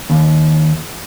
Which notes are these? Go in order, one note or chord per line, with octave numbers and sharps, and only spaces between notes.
D#2